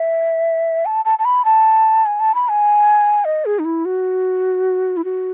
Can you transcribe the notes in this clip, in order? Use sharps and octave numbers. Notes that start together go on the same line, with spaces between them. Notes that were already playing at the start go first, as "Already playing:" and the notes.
Already playing: E5
A5
A5
A5
B5
A5
G#5
A5
B5
G#5
D#5
G#4
D#4
E4
F#4
E4
F#4